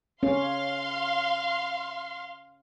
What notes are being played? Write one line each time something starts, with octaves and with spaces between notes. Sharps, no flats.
C#4 F5 C6